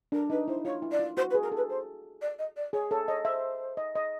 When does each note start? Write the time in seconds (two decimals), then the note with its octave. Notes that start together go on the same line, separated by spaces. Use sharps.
0.12 D4 A#4
0.30 D#4 B4
0.48 E4 C5
0.65 F4 C#5
0.82 E4
0.91 D5
0.99 F4
1.16 F#4 C5
1.30 B4
1.34 G#4
1.42 A#4
1.52 A4 B4
1.69 C5
2.21 D5
2.38 D#5
2.56 D5
2.73 G#4 C#5
2.90 A4 C#5
3.07 C#5 D#5
3.25 C5 E5
3.77 D#5
3.95 D#5